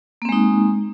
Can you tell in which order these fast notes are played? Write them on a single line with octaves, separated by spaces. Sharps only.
A#3 C4 G#3 D#4